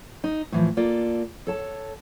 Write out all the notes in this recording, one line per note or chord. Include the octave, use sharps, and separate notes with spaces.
D#4
A2 E3 F3
A#3 F4 A4 D5
A4 C#5 A5